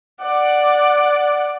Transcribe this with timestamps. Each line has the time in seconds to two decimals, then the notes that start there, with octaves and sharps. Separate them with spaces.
0.22 D5 F#5